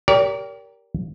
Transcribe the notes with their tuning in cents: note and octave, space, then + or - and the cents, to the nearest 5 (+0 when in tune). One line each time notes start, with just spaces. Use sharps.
G4 +0 A#4 +0 D5 -45